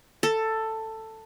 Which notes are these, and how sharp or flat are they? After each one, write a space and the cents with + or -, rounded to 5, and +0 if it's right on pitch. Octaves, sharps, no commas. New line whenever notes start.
A4 +10